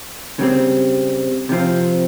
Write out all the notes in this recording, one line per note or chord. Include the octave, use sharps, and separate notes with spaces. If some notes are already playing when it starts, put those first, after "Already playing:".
C#3 G3 C4
C3 F3 C4